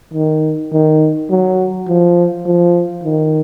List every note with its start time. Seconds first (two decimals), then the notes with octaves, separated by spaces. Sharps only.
0.13 D#3
0.72 D#3
1.30 F#3
1.87 F3
2.45 F3
3.03 D#3